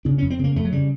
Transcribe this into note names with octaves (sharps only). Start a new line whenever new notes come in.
C#3 D4
F2 C#4
C4
C#3 A#3
F2 A3
F#3
C#3 G3